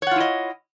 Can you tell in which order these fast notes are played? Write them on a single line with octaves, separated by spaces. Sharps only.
C#5 F#5 F4 E4 D#5